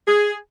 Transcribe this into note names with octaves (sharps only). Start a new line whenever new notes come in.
G#4